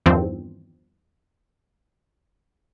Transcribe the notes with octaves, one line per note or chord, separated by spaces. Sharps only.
E2 G2 D#3 F3 C4